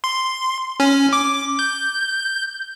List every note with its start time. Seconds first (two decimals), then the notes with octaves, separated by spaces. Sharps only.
0.04 C6
0.80 C#4
1.13 D6
1.59 G6